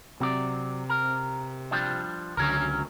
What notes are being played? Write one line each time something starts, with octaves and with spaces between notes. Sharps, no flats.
C3 F#3 C4 D5
A#4
F3 G3 D4
C#2 D3 F#3 C#4 A#4